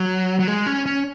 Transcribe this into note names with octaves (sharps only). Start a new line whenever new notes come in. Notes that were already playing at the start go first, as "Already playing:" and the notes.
Already playing: F#3
F#3
G#3
C#4
C#4